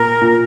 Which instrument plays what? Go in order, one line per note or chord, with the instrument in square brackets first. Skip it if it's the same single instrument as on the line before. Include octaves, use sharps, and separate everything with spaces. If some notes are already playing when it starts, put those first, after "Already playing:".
Already playing: [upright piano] A#2 [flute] A#4
[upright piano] A#2